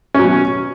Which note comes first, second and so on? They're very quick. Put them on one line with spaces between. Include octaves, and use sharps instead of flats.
C#4 F#3 B2